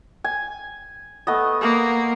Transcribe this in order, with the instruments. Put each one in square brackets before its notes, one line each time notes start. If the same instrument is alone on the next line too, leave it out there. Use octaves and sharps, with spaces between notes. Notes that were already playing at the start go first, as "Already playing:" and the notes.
[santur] G#5
A3 B3 D#5
[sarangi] A#3